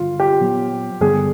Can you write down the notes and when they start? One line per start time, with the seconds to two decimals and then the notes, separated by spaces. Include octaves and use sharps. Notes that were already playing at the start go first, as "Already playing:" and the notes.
Already playing: G2 D3 G3 F4
0.20 G4
0.40 A#2 F#3 B3
1.00 G2 D3 G3 B3 G#4